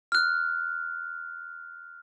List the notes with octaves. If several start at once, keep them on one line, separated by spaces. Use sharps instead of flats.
F6 F#6